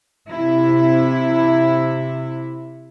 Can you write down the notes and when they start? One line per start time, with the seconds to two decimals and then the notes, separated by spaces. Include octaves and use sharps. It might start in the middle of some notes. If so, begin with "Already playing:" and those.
0.28 C3 E4